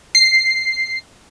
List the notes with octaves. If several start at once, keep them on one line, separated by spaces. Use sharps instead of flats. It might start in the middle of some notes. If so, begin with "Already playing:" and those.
C7